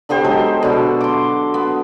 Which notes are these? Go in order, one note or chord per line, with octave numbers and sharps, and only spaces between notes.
D3 B3 G4 C5
F#3 G#3 A4
B2 D3
C6 D6
B3